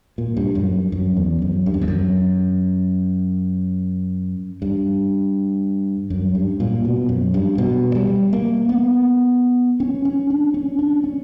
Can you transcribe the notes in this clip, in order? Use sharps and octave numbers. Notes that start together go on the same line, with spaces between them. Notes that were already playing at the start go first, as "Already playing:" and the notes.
A#2
G2
F#2
F#2
E2
F#2
G2
F#2
E2
F#2
G2
F#2
G2
A#2
B2
F#2
G2
B2
G3
A#3
B3
C#4
C#4
D4
C#4
D4
C#4